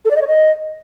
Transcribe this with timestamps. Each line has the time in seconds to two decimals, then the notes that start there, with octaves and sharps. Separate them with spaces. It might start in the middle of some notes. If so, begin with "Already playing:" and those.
0.05 A4
0.11 D5
0.16 D#5
0.22 C#5
0.27 D#5